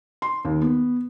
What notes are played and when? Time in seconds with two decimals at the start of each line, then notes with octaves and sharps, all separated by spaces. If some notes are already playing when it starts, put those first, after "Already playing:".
0.22 C6
0.45 D#2
0.61 B3